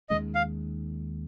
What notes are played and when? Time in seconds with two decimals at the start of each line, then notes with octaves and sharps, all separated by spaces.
0.10 D#2 D#3 G#3 C#4 D#5
0.35 F5